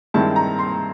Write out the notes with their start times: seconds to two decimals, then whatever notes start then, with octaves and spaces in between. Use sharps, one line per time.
0.14 G2 D#3 G#3 C4 E4 A5
0.36 A#5
0.59 C6